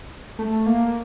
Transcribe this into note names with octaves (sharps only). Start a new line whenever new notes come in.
A3
A#3